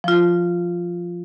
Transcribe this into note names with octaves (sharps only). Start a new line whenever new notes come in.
F3 F4